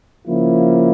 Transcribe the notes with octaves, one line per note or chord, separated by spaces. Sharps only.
C#3 F3 A#3 E4